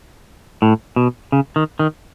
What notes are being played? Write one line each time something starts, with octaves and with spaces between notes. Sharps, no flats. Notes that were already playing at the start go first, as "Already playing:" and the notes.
A2
B2
C#3
D#3
D#3